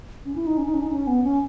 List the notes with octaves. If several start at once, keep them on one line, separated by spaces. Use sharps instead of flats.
C#4
E4
D#4
C#4
D#4
C#4
D#4
C#4
B3
C#4